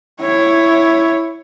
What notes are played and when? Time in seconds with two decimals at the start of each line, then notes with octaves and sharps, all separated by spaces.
0.21 E4 C#5